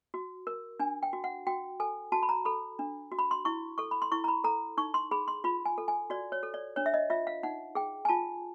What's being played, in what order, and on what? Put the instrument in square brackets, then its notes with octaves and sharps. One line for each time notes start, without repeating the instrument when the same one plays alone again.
[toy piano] F#4
A#4
D4 G#5
G5
F#4
F#5
F#4 G5
A4 G#5
F#4 A5
B5
A#5
A4 B5
D4
F#4
B5
C6
E4 C#6
A4 C#6
B5
C6
E4 C#6
A#5
B5
A4 A#5
D#4 C#6
C6
G#4 B5
C6
F4 B5
G#5
A4
G#5
F#4 D5
C#5
A4
D5
D4 C#5
E5
D#5
F4 E5
F5
D#4 F#5
G#4 G5
G#5
F4 A5